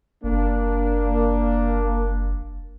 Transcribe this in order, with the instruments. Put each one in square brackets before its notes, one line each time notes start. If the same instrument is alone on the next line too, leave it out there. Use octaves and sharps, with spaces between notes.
[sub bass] F#1 [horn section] A#3 D4